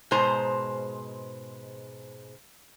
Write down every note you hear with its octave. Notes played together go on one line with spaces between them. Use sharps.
G#2 B2 G#3 C5 A#5